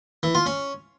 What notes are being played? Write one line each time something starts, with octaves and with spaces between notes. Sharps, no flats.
E3
F4
C#4